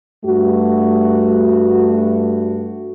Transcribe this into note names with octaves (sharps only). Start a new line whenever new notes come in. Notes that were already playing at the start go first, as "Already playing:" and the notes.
G2 A3 F#4